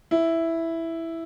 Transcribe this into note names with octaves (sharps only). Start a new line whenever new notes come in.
E4